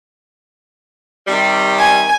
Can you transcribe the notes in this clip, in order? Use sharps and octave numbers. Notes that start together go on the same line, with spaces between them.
C3 D#3 G3
G#5